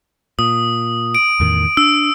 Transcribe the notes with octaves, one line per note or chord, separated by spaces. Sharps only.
A#2 D#6
D7
E2 A2 D#3
D4 E6